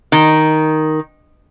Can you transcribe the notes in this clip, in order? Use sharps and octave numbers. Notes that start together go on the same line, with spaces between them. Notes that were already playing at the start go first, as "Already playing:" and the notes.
D#3